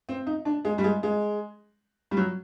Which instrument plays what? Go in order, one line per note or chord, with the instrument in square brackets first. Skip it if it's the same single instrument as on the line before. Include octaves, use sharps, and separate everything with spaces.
[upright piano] C4
D#4
D4
G#3
G3
G#3
G#3
G3
F#3